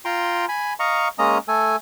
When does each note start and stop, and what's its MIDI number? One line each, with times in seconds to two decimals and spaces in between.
0.05 0.46 65
0.05 0.46 79
0.05 0.46 82
0.05 0.46 84
0.49 0.73 80
0.49 0.73 83
0.80 1.08 75
0.80 1.08 77
0.80 1.08 82
0.80 1.08 85
1.19 1.38 56
1.19 1.38 58
1.19 1.38 61
1.19 1.38 75
1.19 1.38 82
1.19 1.38 87
1.48 1.76 57
1.48 1.76 69
1.48 1.76 80